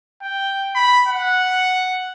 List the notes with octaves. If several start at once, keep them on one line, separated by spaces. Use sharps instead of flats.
G5
B5
F#5